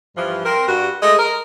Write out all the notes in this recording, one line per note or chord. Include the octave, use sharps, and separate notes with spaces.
G2 E3 F3
C4 A#4
G2 F#4
G#3 A3 D#5
A#4